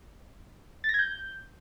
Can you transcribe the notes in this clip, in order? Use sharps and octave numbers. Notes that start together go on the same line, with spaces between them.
A6
A#6
G#6
G6